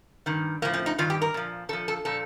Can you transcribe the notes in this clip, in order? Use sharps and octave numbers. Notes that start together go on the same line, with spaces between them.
G2 D#3
A2 F3 A#3
C4
D#4
G2 D#3 F4
G4
A#4
A#2 F3
A#2 F3 A4
A4
A#2 F3 A4